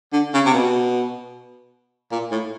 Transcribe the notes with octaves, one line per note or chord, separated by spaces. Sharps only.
D3
C#3
C3
B2
A#2
A2